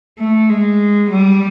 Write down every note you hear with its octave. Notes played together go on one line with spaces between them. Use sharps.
A3
G#3
G3